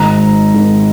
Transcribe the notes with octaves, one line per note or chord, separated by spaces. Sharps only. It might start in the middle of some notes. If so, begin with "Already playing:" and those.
Already playing: G#1 G#2 D#3 A#5
G#1 G#2 D#3